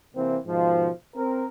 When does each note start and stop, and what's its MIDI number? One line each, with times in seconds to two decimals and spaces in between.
0.15 0.36 48
0.15 0.36 52
0.15 0.36 58
0.15 0.36 60
0.46 0.88 44
0.46 0.88 47
0.46 0.88 51
0.46 0.88 53
1.16 1.45 60
1.16 1.45 70